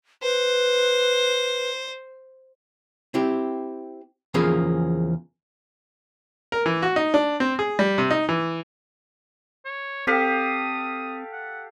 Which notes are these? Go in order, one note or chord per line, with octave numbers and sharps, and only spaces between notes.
B4 C5
C4 E4 G4
E2 C#3 F3 A#3 G#4 B5
A#4
E3
F#4
D#4
D4
C4
G#4
G3
C3
D#4
E3
C#5
C4 G4 A4 F5 G5 D#6 B6
F#5